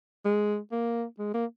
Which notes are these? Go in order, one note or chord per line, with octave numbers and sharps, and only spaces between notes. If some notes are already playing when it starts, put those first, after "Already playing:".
G#3
A#3
G#3
A#3